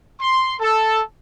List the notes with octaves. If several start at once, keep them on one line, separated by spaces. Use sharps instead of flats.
C6
A4